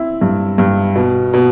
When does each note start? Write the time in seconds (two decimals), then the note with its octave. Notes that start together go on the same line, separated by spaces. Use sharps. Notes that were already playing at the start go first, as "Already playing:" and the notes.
Already playing: C4 E4
0.21 G2
0.58 G2
0.95 B2
1.34 B2